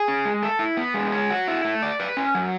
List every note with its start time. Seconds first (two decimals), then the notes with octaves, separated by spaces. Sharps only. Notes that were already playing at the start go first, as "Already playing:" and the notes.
Already playing: G#4
0.08 C#4
0.25 G#3
0.43 A4
0.59 E4
0.77 B3
0.94 G#3
1.12 C#5
1.30 F#4
1.48 E4
1.65 A3
1.83 D5
2.00 B4
2.17 C#4
2.35 F#3